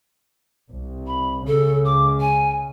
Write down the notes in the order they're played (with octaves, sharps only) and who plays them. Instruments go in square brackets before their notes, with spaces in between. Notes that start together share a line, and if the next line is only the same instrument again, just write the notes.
[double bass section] C2
[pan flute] B5
[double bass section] C#2 C#3 [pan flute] A4
[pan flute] D6
G#5